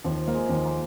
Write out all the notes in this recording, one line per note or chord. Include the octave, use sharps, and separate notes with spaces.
D#2 F3
A#3
G#3
D#2
A#3